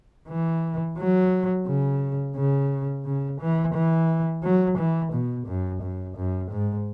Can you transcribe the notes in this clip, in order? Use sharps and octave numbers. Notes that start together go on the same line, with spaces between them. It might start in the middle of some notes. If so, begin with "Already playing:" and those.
E3
F#3
C#3
C#3
C#3
E3
E3
F#3
E3
B2
F#2
F#2
F#2
G#2